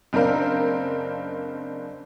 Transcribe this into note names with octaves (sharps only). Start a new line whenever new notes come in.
F#1 C4 D4 A#4 F5